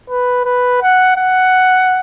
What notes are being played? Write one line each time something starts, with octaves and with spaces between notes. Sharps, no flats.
B4
B4
F#5
F#5